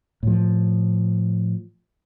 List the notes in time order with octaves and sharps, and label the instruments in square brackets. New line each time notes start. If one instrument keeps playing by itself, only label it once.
[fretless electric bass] A2 F3